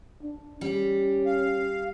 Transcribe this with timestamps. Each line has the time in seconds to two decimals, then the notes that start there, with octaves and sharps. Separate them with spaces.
0.22 D4
0.61 G3 C#4 G4
1.26 F5